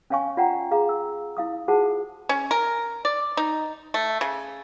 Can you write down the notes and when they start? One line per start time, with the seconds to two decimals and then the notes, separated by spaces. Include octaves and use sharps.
0.10 C#4 C#5 F5 G#5 C#6
0.37 F4 D5 F#5 G5 A#5
0.71 G#4 F5 A#5
0.89 E6
1.37 E4 F5 D#6
1.68 F4 F#4 G#4 C5 F#5 A5
2.29 C#4
2.51 A#4
3.05 D5
3.37 D#4
3.94 A3
4.21 C#3